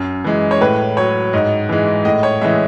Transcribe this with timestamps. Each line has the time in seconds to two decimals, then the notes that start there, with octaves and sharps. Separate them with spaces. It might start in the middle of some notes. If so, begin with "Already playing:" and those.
Already playing: F#2
0.24 E3 G#3
0.51 C#5
0.61 A2 B4
0.97 F#3 C#5
1.33 G#2 D#5
1.69 E3 G#3
2.05 A2 D#5
2.23 C#5
2.41 E3 G#3 E5